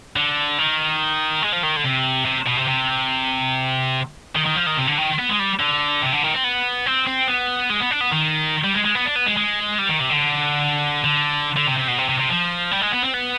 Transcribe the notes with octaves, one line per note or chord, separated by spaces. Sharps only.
D3
D#3
G#3
F3
D#3
D3
C3
C3
B2
C3
C3
D#3
D#3
F3
D#3
C3
D3
D#3
B3
G#3
G3
D3
C3
D3
D#3
C4
B3
C4
C4
B3
G#3
B3
D4
B3
D#3
G3
G#3
G#3
B3
D4
B3
G#3
G#3
G3
D#3
C3
D3
D3
D3
C3
C3
B2
C3
C3
C3
F3
G3
G#3
B3
C4
B3